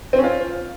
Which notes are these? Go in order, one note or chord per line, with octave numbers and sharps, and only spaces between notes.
C4
C#4
F4